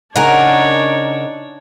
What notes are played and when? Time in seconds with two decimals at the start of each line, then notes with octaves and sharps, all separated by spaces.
0.16 C#3 D4 D#4 A#4 C#5 F#5 G#5 A#5